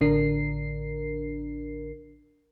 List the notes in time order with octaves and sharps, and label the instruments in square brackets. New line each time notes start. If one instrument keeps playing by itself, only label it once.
[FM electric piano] A1 D3 D4 A#4 C7